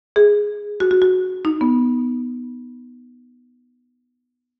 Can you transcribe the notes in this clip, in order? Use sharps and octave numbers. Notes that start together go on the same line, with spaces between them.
G#4
F#4
F#4
F#4
D#4
B3